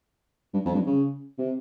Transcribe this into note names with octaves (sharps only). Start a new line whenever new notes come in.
G2
F2
G2
C#3
C3